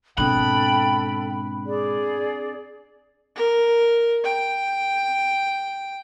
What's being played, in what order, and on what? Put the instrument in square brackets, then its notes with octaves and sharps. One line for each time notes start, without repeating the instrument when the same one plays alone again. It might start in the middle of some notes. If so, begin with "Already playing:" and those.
[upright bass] G#2 B2 [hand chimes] C4 D4 F#6 [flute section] A4 G5 [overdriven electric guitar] B5
[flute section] G#4 D5
[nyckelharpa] A#4
G5